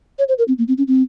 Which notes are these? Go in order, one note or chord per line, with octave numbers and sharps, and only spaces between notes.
C#5
C5
A#4
C4
A#3
C4
C#4
C4